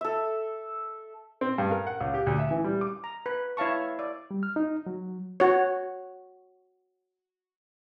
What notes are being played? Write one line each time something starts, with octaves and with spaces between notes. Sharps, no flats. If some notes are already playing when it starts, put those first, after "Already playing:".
A4 E5
C4
G2
A#4
F#5
C#2
G4
D2
E5
E3
G3
D6
A#5
B4
E4 C#5 F5 A5 C#6
D5
G3
F6
D#4
F#3
F#4 C#5